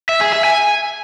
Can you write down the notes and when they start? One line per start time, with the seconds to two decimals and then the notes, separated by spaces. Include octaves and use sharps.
0.09 E5
0.21 G#4
0.33 E5
0.45 G#5